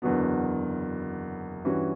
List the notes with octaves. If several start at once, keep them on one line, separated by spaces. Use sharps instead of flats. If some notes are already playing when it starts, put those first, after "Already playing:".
F#1 E2 D3 F#3 B3
G2 E3 G3 C#4 F#4